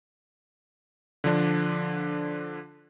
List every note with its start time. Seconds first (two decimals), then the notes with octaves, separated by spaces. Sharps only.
1.24 D3 F3 D4